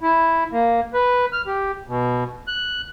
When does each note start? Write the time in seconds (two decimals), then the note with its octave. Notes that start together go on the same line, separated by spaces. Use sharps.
0.01 E4
0.52 A#3
0.94 B4
1.33 F6
1.47 G4
1.88 B2
2.48 F#6